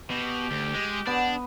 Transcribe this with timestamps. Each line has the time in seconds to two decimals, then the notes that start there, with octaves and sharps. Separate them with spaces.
0.10 B2 G4
0.51 D2
0.74 G#3
1.07 B3 D4